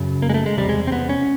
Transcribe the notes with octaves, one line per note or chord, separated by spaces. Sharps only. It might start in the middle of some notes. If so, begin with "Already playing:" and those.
Already playing: F#2 C#3
A#3
G#3
A3
G#3
E2 C3 G3
G#3
C4
B3
C#4